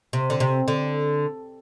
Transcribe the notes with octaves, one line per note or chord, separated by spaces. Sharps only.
C3
D3
C3
D3